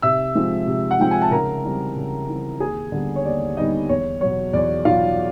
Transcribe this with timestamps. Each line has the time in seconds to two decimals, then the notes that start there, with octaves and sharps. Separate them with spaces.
0.02 C3 E5 E6
0.35 F3 G#3 C4 F4
0.67 C3
0.91 F#5
1.00 F3 G#3 C4 F4 G5
1.11 G#5
1.22 A5
1.31 C#3 A#4 A#5
1.63 E3 G3 C4
1.95 C#3
2.29 E3 G3 C4
2.60 D#2 G#4 G#5
2.92 D3 G3 B3
3.16 C#5
3.25 D#2 D5
3.57 D3 G3 B3 D#4 D#5
3.89 E2 C#5
4.21 B2 F#3 C#5
4.53 E2 D5
4.85 B2 F#3 F4 F5